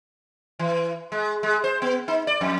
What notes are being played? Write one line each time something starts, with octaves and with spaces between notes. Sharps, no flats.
E3
G#3
G#3
C5
B3
D#4
D5
F2